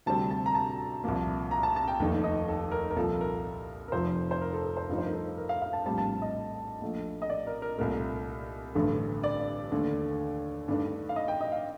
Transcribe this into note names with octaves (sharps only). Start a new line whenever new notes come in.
D2 C3 G3 C4 A5
A5
A#5
A5
C2 A#2 F3 A#3
A#5
A5
A5
G5
F1 D#2 D#3 A3 D#4
D#5
A4
A#4
A#4
C2 A#2 F3 A4
A#4
A#4
F1 F2 C3 F3 C5
C5
A#4
A4
A4
C5
G2 F3 A3 D#4
C5
A#4
A4
A#4
F5
F5
A5
A#1 A2 G3 C4 A5
A5
D#5
A#1 A#2 A3
D#5
D5
A#4
A#4
C2 A#2 A3 A#4
A1 G2 D3 A3
D5
D#2 D3 A3
G2 D#3 A3 D4
F5
D#5
G5
D#5
F5